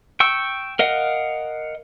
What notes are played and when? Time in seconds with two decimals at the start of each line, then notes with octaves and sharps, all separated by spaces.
0.20 G5 C#6 E6
0.79 A#4 D#5 F5 F#5